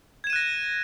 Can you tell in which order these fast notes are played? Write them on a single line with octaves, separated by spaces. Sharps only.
G#6 E7 D#7 F#6 A#6